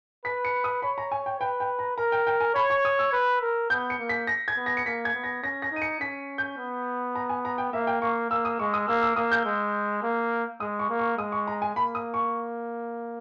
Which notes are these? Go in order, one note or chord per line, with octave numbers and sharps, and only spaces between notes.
B4 B6
C#7
D#6
C#5 B5
A#5
G#5
G5
B4 G5
G5
A#5
A#4 A#5
G5
G5
G#5
C#5 B5
C#6
D#6
E6
B4
A#4
B3 G6
C#7
A#3
B6
A#6
G#6
B3
A#6
C#7
A#3 B6
G#6
B3
A#6
C#4 A#6
A#6
D#4 D#7
C#7
C#4 B6
G6
B3
A#5
G#5
A#5
G5
A#3 E5
G5
A#3 C#6
A#3 E6
D#6
G#3 C#6
D#6
A#3 E6
E6
A#3 D#6
G6
G#3
A#3
G#3 D#6
C#6
A#3
C#6
G#3 D#6
C#6
A#5
G#5
A#3 B5
D#6
C#6